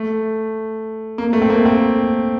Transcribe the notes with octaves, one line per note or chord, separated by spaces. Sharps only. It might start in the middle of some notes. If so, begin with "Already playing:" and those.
Already playing: A3
A#3
A3
C4
A#3
A3 C4